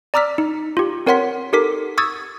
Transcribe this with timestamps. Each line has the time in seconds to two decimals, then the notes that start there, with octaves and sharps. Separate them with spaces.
0.14 D5 A#5 D6 E6 F6 B6
0.38 D#4
0.77 F4 G4
1.06 C4 A#4 C#5 F#5 C6 B6
1.53 D#4 G4 A4 A#4 D6 B6
1.98 C#6 D#6 E6 G#6 A6